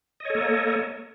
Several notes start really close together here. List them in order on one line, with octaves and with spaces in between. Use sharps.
D#5 C#5 A4 A#3